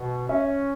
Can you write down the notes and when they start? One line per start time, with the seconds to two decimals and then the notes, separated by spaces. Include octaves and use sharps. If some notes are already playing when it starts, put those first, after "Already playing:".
Already playing: B2
0.29 C#4 E5